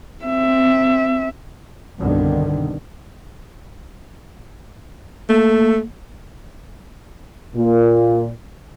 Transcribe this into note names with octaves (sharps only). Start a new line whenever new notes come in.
C4 E5
C2 G2 B2 D3 D#3
A3 A#3
A#2